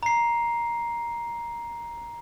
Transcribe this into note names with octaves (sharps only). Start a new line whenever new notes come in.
A#5 C7